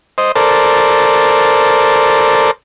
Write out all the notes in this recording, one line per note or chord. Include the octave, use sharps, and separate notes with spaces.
C5 D#5
A4 A#4 C5 D5